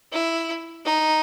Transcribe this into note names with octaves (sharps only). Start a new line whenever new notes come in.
E4
D#4